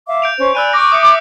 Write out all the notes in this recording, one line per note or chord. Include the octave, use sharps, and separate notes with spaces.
E5 F5 D6
G6 D7 F7
C#4 C5
D5 G#5 B5 E6 F#6 D#7
C#6 D6 A#6
E5 D#6 G6 C#7